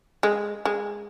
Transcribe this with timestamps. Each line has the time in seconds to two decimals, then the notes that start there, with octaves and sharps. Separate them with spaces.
0.23 G#3
0.65 G#3